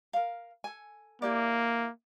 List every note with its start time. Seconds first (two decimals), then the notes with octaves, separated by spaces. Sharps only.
0.13 A#4 F5
0.64 A4 G#5
1.22 A#3 E4 G4 D5